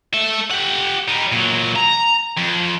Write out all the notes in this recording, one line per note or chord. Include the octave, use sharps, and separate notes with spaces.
A4 E5
G4 F#5
G3 D#4
A#2 F#3
A#5
F2